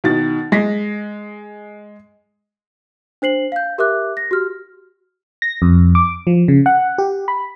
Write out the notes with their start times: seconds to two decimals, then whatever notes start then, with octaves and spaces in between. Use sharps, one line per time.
0.04 B2 D#3 A6
0.52 G#3 A#6 B6
3.22 D4 C5 C7 F#7
3.52 F5 G6
3.78 G4 A#4 E5 D6 F#6
4.17 A#6
4.31 F#4 G4 F6
5.42 A#6
5.62 F2
5.95 D6
6.27 F3
6.48 C#3
6.66 F#5
6.98 G4
7.28 B5